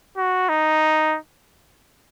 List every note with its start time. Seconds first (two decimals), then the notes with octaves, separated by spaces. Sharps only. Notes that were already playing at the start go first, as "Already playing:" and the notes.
0.17 F#4
0.49 D#4